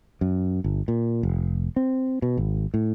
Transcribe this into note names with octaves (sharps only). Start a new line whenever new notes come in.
F#2
G1
A#2
F1
C4
B2
G#1
A2